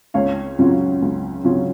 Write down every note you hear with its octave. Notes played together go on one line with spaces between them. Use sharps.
C#2 C#5 F5
C#3 F#3 C#4 F4
C#2
C#3 F#3 C#4 F4